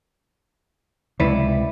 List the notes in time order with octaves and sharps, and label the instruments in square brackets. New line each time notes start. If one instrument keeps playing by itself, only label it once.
[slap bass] C#2 C3 [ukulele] E4 B4 D5